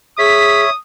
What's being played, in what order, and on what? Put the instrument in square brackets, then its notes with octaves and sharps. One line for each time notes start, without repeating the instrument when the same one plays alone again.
[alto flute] G#4 [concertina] C#5 E5 [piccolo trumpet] D#6 [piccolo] B6